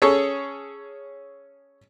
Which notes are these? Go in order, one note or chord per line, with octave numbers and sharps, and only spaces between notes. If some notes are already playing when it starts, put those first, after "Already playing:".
C#4 G#4 A4 C#5